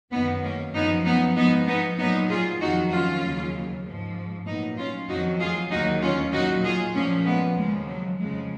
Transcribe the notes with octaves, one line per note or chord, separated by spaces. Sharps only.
F#2 D#3 F#3 B3 D#4
A#3 C#4
F#2 F3 B3 D#4
B3 D#4
G#2 F3 B3 D#4
B3 D#4
A#2 F#3 B3 D#4
F4 G#4
F2 D#3 F#3 D#4 F#4
C#4 F4
D#2 C#3 F#3
G#2 F3
A#2 F#3 B3 D#4
C#4 F4
F2 D#3 F#3 D#4 F#4
F4 G#4
D#2 D#3 F#3 D#4 F#4
C#4 F4
A#2 F#3 D#4 F#4
F4 G#4
A#2 F3 A#3 C#4
G#3 B3
D#2 C#3 F3 G#3
F#3
F2 C#3 F3 G#3